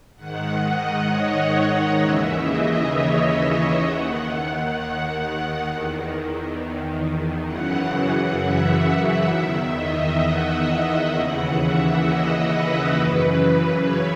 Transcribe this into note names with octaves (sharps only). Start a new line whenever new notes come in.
G#2 D#3 F#5
D#5
C#5
D#5
D#2 C#3 E3 E5
D#5
C#5
C#5
D#2 D#3 F#5
F#5
F#5
E2 D#3
F#2 C#3 E3 F#5
F#5
E5
E2 D#3 E5
D#5
F#5
D#2 C#3 E3 F#5
E5
D#5
B4
F#2 C#3 E3
C#5